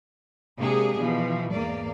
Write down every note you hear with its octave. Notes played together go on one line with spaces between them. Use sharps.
C3 G#3 A#3 D4 G4 G#4
B2 E3 F3
E2 G#2 A#3 D5